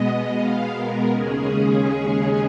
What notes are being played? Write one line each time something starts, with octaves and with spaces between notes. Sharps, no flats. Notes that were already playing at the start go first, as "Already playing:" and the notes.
Already playing: B2 G#3 B3 D#5
F5
A#4
D#2 C#3 G#3 C#4 G#4